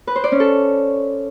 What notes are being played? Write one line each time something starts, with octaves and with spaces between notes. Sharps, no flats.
B4
C5
D5
C#4
A4